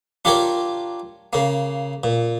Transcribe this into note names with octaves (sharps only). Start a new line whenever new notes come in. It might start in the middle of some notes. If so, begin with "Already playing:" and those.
D4 F4 G4 A#4 C#5 D5
C#3 A#3
A#2